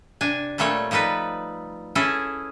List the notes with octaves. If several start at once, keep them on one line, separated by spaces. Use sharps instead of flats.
C3 D4 G#5
A#2 G3 A3 C4 C#5
F3 G3 D#4 A4 B4
C#4 E4 G#4 A4